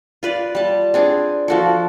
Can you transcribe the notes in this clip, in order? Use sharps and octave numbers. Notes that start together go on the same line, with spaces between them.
F4 B4 D5
G3 A5
C4 D4 G#4
F3 F#4 A4